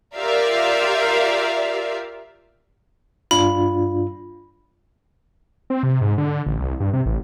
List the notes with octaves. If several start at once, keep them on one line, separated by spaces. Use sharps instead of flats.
F4 G4 A#4 D5 E5 F5
G2 D4 F4 B5
C4
C3
G#2
D3
A1
C2
G2
C3
A1